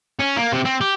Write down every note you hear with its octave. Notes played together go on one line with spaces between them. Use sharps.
C#4
A#3
C3
C4
G4